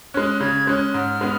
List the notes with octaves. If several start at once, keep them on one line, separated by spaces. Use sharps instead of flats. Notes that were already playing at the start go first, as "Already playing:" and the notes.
G#3 C#4 F#6
C#3 G#6
G#3 C#4 F#6
G#2 F6
G#3 B3